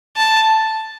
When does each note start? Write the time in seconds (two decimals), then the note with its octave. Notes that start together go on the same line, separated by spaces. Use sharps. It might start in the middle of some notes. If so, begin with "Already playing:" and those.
0.16 A5